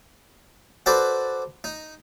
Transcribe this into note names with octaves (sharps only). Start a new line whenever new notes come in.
F#4 A4 B4 C5 D5
D#4